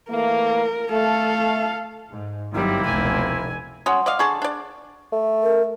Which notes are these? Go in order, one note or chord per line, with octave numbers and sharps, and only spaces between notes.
E3 A3 A#3 A#4
A3 A4 F5
G#2
G1 D#3 F#3 G3 A#3 C4 E4
F1 C#2 B2 G#5
F#3 C#4 F#5 C6 D#6
D5 D#5 F5
D3 G#4 A5 C#6
D4 D5
A3
A#4